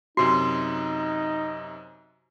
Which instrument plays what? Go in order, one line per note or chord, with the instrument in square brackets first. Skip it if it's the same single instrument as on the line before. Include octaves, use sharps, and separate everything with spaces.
[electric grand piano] F#2 C3 C7 [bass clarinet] D#4 [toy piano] F#4